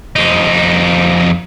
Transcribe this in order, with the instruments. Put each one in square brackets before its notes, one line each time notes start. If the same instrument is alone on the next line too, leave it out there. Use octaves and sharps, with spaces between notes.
[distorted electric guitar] F2 D#4